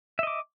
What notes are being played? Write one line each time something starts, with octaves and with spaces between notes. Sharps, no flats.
D#5 E5 D6